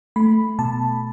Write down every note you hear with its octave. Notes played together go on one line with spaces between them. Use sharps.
A3 B5
B2 A5